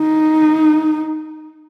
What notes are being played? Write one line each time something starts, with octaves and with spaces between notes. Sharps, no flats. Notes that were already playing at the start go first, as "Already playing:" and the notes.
Already playing: D#4